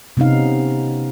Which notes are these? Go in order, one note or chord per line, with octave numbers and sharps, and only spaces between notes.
C3 B3 C#4 D#4 F5